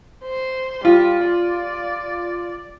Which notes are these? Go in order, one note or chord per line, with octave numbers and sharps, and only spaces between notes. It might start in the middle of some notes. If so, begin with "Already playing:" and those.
C5
G3 F4
D5